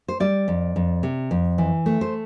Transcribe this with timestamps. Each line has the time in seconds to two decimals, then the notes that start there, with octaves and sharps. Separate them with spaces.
0.08 C5
0.20 G3 D5
0.48 F2
0.76 F2
1.03 C3
1.31 F2
1.58 E3
1.86 A3
2.01 C5